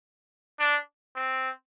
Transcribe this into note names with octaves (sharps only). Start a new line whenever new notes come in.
D4
C4